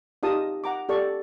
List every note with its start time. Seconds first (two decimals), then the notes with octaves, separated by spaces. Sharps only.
0.23 D#4 F4 G4 D#5 A5 D#6
0.64 F#5 A#5 D6
0.89 G4 A4 D5 C#6